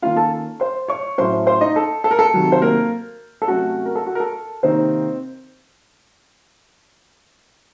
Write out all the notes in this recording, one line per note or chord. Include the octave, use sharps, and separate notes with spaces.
D#3 A#3 C#4 F4 F5
A4 A5
C5 C6
C#5 C#6
A2 F#3 A3 C#4 C5 C6
C5 C6
D#4 D#5
A4
A4
A#4
A4
C3 D#3 F#3
C5
A#3 A#4
A4
C3 F#3 A3 C#4 F#4
A#4
A4
F#4
A#4
A4
C3 D#3 A#3 C4 D#4 C5